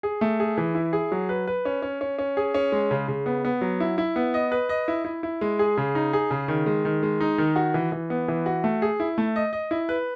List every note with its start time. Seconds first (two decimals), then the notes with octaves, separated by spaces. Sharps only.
0.03 G#4
0.21 A3
0.40 G#4
0.58 E3
0.75 E4
0.93 G#4
1.12 F#3
1.29 B4
1.47 B4
1.65 C#4
1.82 C#4
2.01 C#4
2.19 C#4
2.37 G#4
2.54 C#4
2.72 G#3
2.91 C#3
3.08 C#3
3.26 B3
3.45 B3
3.61 F#3
3.80 E4
3.98 E4
4.16 B3
4.34 D#5
4.52 B4
4.69 D#5
4.88 E4
5.05 E4
5.23 E4
5.41 G#3
5.59 G#4
5.77 C#3
5.95 D#4
6.13 G#4
6.31 C#3
6.48 D#3
6.66 G#3
6.85 D#3
7.03 G#3
7.20 D#4
7.38 D#3
7.56 F#4
7.74 E3
7.92 E3
8.10 B3
8.28 E3
8.46 F#4
8.64 A3
8.82 G#4
9.00 E4
9.18 A3
9.36 D#5
9.53 D#5
9.71 E4
9.89 B4